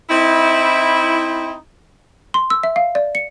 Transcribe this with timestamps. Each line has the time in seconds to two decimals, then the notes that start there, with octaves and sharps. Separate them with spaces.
0.10 C4 D#4 E4
2.34 C6
2.50 E6
2.63 E5
2.76 F5
2.95 D5
3.15 C#7